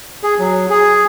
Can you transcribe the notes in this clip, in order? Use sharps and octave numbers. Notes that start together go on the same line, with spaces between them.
G#4
F#3
G#4